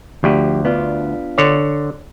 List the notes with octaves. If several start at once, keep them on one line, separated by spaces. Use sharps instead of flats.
D2 F3 G4
B3 D4 F4
D3 C#5